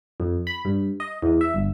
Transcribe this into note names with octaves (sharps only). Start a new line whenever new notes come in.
F2
B5
G2
D#5
E2
E5
G1